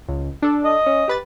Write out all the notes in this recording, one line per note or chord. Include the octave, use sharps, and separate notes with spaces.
C#2
D4 A4
D#5
C#4
G4 B4 A6